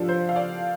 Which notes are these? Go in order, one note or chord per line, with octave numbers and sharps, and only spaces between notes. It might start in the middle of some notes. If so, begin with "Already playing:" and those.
Already playing: F3 D4 F4 G4 A4
C5
F5
D5